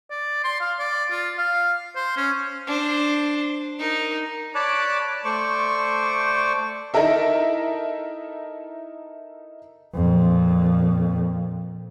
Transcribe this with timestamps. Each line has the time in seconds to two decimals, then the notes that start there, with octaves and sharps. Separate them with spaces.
0.11 D5
0.44 C6
0.61 F5
0.79 D5
1.10 F4
1.38 F5
1.96 C5
2.17 C#4
2.67 D4 C5
3.79 D#4 A#4
4.55 C#5 D5 A5 B5 D6 F#6
5.25 A3 C5 D5 C#6
6.94 D#4 E4 A4 A#4 E5
9.95 F2 A#2